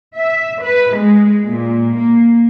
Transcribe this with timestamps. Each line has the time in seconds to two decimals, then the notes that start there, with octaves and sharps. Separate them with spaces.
0.17 E5
0.62 B4
0.97 G#3
1.48 A#2
1.99 A#3